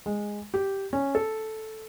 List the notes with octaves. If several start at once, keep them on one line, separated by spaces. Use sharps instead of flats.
G#3
G4
C#4
A4